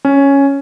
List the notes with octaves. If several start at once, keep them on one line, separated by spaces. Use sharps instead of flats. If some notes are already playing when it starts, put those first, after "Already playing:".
C#4